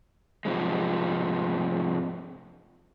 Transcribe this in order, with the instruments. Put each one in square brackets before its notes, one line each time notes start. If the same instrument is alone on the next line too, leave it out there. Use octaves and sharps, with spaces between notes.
[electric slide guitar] G#2 C3 F3 G#3